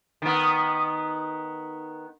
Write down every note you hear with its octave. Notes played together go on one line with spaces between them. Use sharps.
D#3 B3